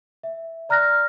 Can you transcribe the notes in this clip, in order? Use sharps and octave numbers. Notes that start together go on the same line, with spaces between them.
E5
D5 A#5 F6 F#6 A#6